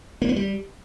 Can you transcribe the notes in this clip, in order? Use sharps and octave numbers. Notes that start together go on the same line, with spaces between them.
A#3
B3
G3